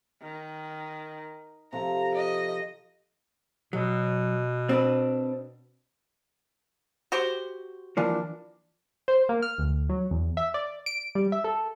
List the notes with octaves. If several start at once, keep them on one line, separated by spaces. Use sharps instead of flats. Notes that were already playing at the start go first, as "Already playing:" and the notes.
D#3
C3 F3 A4 A#5
D#5
B2 F#3
C4 D4 B4
F#4 G4 C5
E3 F3 A#3 D4
C5
A#3
F6
D2
F#3
E2
E5
D5
D7
G3
E5
A4